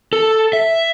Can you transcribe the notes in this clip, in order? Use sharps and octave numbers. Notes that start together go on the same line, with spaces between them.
A4
E5